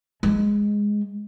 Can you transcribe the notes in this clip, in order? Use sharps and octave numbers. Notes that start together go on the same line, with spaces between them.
G#3